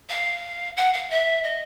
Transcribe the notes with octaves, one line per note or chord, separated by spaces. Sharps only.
F5
F#5
F5
E5
D#5